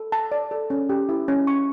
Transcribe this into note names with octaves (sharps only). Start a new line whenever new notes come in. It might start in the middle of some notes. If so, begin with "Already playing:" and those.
Already playing: A4
A5
D5
A4
C#4
G4
E4
C#4
C#6